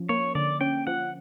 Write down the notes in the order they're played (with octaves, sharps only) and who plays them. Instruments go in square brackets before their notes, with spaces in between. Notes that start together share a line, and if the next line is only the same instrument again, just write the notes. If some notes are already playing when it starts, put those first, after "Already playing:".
Already playing: [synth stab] F3 C#4
[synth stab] A#3 [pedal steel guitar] C#5
[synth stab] D3 [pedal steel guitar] D5
[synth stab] C#4 [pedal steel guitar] G5
[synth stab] F3 [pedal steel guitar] F#5